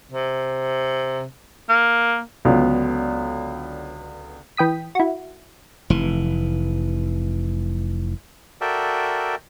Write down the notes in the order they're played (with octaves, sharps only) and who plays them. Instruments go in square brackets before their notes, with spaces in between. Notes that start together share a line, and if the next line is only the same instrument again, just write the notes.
[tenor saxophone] C3
A#3
[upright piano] C#2 D3 F#3 B3
[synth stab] E3 G5 D#6 B6
E4 F#4
[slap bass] F1 E3
[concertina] F#4 A4 A#4 D5 E5 G5